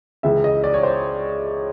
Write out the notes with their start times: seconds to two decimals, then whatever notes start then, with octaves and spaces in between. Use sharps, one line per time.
0.23 C#2 C#3 E3 E5
0.44 D#5
0.64 D5
0.74 C#5
0.83 C5